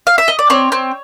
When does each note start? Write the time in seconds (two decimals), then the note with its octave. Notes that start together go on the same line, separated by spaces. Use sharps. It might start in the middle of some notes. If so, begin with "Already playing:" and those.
0.07 F5
0.18 E5
0.28 D#5
0.39 D5
0.50 C4 C#5
0.72 C4